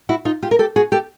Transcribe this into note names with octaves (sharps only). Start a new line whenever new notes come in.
E4 F#4
D#4 F4
F4 G4
A#4
G4 A4
F#4 G#4
G4 A4